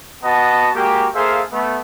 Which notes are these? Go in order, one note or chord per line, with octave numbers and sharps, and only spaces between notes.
B3 F#4 D#5 A5
G#3 A#3 F#4 G4
A#3 G#4 A4 C5 E5 F5
A3 B3